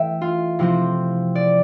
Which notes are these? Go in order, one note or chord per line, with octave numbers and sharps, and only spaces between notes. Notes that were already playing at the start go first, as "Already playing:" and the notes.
Already playing: E3 A3 E5 G5
F4
C3 F3 C4 E4
D5